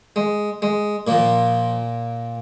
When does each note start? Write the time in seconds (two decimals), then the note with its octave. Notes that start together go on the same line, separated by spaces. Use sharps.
0.16 G#3
0.62 G#3
1.07 A#2 F3 A#3